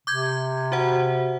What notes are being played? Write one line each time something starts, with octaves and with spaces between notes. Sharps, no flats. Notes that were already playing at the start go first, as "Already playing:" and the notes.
C3 D6 G6 G#6
F#4 C5 F#5